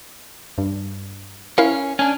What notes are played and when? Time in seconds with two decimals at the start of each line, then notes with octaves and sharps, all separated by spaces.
0.58 G2
1.58 C#4 E4 A#4 F5
1.99 C#4 D4 G#5